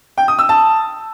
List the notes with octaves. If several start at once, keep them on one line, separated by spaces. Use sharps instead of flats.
G5
D#6
E6
A5